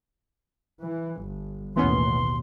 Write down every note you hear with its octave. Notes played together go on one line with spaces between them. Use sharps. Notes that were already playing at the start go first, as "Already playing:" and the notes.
E3
G1
A1 D#2 B2 E3 B3 C#4 C6